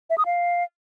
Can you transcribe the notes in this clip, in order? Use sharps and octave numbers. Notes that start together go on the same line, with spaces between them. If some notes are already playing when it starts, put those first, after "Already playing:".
E5
D#6
F5